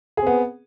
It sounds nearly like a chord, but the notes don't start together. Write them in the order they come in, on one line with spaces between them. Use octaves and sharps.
G#4 C4 B3